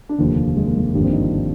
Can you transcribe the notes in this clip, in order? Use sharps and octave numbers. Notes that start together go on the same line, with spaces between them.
D4
F1 D#2 D3 F3 A#3
G#3
A#3
G#3
G#1 G2 D3 F3 A#3
C4
D#4
F4
D4